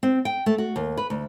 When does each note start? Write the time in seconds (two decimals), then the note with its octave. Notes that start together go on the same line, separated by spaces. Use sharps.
0.03 C4
0.25 G5
0.46 A3
0.58 F#4
0.76 D#2
0.97 B4
1.10 D2